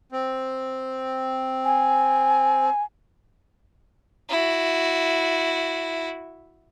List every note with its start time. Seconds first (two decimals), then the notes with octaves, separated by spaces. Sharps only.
0.12 C4
1.65 G#5
4.29 E4 F#4